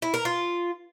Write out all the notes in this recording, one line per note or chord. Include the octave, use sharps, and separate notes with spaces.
E4
A#4
F4